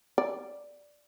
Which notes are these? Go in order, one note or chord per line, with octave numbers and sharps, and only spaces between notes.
D5